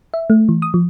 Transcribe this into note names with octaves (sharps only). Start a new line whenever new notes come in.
E5
A3
E3
D#6
F3